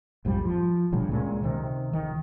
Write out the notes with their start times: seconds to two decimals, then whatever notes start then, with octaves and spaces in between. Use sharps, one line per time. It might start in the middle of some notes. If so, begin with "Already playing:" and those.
0.25 A#1 F2 G#2 G3
0.45 F3
0.92 D2 G2 A#2 C#3
1.11 C#2 A#2 G#3 C#4
1.43 C3 D#3
1.93 C#2 D#3